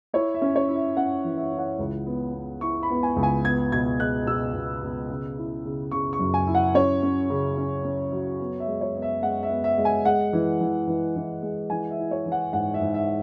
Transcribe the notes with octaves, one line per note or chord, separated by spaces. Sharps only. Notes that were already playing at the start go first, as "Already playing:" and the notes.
E4 C#5
E5
C#4
C#5
E4
E5
C#4 F#5
E3
E5
E4
F#5
C#2
B3
B3
E4 C#6
B5
B3
G#5
C#2
G#5
B3 G#6
B2 G#6
G#3 F#6
B2 E6
B2
B2
C#3
E4
C#3
C#3 C#6
C#6
F#2
G#5
E4
F#5
C#4 C#5
C#4
C#3
C#4
C#4
F#3
B3
E5
G#3
C#5
B3
E5
G#3 F#5
E5
B3
E5
G#3
G#5
G#3 F#5
E3
E3
E3
E3
G#3
E3 G#5
E5
E4
C#5
E3
F#5
G#2 F#5
E5
G#2
E5